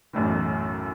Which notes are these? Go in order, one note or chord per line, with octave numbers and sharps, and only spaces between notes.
B1 F#2 A2 E3